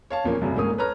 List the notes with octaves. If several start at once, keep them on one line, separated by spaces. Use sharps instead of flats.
C#5 F5 A5
E2 A#2 F3 A#3 C#4
C2 F#2 C#3 A3
D#1 D2 G#2 A#3 C#4 D#6
A4 B4 C#5 A#5 F6